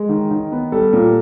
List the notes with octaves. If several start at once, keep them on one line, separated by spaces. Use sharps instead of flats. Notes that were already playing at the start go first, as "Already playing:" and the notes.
Already playing: G#3
D#3
D#3
B3
G3 A4
A#2